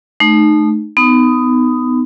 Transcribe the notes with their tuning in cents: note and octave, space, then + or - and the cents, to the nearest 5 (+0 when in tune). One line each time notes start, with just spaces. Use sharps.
A3 -20 D#4 -25
B3 +25 D#4 +0 D#6 +0